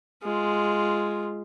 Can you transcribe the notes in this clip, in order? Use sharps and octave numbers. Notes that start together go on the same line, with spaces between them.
G#3 F4